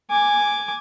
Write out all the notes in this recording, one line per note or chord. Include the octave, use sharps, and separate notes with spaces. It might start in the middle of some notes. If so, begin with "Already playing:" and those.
G#5 D6